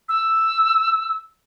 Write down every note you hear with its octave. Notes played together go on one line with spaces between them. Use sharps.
E6